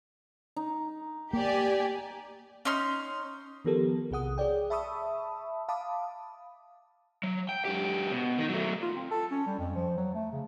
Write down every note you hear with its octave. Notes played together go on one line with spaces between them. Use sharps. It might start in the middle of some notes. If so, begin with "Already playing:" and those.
D#4
A#3 G4 D5 G#5
C#4 D#4 C6 F6
D#3 F3 B3 G4 A4 A#4
B1 C3 G#4 F#5 D#6
G#4 C#5 D5 G5
E5 A5 B5 C#6 D#6 E6
F5 A5 B5 D6 D#6
F#3
G5
F#2 G4
B2
D#3 D#4
F#3 A3
F4
C4
A4
C#4
G3
F2
F3
F#3
A3
C#3